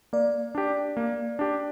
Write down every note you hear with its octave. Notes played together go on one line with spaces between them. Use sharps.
A#3 D5
D4 G4
A#3
D4 G4